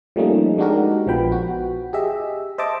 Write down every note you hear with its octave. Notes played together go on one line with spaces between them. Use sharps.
F3 G3 A3 A#3 C#4 D#4
G#3 D4 D#4 F#4 G4 A#4
A#1 F3 B3 G5 B5
F#4
G4 G#4 D#5 E5
C5 D#5 E5 A5 D6